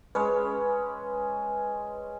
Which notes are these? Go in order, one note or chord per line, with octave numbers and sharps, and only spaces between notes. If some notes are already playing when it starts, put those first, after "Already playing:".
G#3 C#4 B4